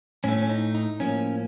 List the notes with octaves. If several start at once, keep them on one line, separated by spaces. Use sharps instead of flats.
A2 A3 C#4
C#4
D#4
D#4
A2 F3 A#3 C#4